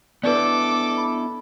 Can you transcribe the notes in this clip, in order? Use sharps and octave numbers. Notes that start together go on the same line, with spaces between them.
B3 D4 E4 A4 B4 D5 D6
B5